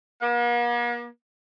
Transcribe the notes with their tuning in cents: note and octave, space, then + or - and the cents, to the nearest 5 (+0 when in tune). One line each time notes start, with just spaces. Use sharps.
A#3 +45